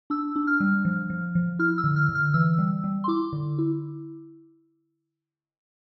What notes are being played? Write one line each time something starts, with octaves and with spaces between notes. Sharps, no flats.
D4 E6
D4
F6
G3
F3
F3
F3
E4 F6
E6
D3
F6
D3
F6
E3 E6
G3
G3
C6
E4 D6
D3
E4